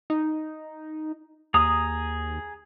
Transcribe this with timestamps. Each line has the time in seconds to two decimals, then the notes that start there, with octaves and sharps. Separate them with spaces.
0.10 D#4
1.54 D#2 G#4 A#5 D#6